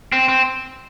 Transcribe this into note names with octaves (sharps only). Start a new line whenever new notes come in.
C4
C4